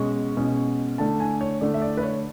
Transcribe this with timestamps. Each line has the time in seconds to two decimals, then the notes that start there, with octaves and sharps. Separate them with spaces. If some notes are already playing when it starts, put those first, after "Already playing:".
Already playing: B2 G#3 C#4 C#6
0.37 B2 G#3 C#4
0.98 D3 A3 D4 A5
1.20 G#5
1.41 C#5
1.61 D3 A3 D4 D5
1.74 E5
1.82 D5
1.97 B4
2.03 C#5